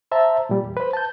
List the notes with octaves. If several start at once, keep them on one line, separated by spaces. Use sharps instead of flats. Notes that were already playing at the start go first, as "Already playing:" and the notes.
C5 E5 A5 A#5
A#2 G3
E2
B4 C5
A5 G6